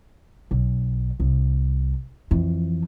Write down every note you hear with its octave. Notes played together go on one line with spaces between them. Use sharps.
B1
C2
F2 E3